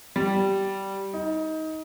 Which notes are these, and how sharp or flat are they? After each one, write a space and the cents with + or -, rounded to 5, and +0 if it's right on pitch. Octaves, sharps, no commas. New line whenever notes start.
G3 -10
D#4 +20